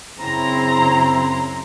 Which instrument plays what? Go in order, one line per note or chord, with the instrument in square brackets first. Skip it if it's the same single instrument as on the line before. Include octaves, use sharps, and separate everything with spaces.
[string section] F#2 C#3 C4 E4 A#5 C6